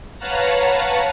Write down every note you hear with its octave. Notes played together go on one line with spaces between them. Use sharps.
B4 C#5 F5 F#5 A5 A#5